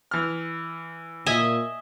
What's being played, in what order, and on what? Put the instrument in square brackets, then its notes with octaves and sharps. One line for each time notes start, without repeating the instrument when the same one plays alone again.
[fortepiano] E3 F6
[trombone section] A#2 [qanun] D#5 E5 G#5